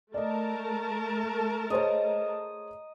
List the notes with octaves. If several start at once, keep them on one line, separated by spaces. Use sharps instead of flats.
A3 A#4 D5 D#5 A5
G#4 C5 C#5 D#5 A#5